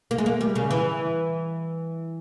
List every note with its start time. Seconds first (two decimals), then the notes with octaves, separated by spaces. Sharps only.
0.11 A#3
0.18 G#3
0.26 A#3
0.41 G3
0.55 C#3
0.71 E3